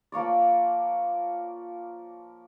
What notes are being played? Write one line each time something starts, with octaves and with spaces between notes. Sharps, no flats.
F3 A#3 C#5 D5